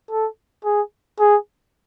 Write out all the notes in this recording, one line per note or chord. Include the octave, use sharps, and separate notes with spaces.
A4
G#4
G#4